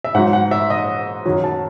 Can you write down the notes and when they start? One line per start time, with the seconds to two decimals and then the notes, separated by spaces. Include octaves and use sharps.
0.04 E5
0.14 G#2 F#3 F#5
0.33 F#5
0.51 E5
0.70 D#5
1.26 F#2 D#3 F#3
1.44 A5